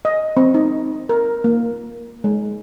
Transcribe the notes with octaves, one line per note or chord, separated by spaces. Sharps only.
D#5
C4
D#4
A#4
A#3
G#3